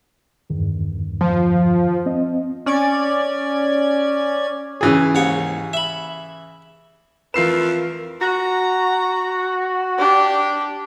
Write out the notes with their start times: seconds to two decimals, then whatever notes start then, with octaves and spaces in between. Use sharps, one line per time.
0.50 E2 G2 D#3
1.21 F3
2.06 C4 D#5
2.66 C#4 D5 G#6
4.81 C#3 E3 G#4
5.15 D#2 G#2 C#5
5.73 E5 B5
7.34 F2 E3 A3 F4 A#4 B4 C7 E7
8.21 F#4 A#5
9.98 D4 G4